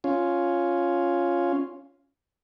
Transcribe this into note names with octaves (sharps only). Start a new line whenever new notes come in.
C#4 F4